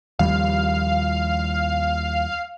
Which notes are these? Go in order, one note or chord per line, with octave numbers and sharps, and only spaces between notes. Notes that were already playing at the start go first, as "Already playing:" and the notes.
D#2 F3 G3 F5